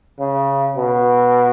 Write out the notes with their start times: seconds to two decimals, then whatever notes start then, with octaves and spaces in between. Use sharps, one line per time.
0.19 C#3
0.76 B2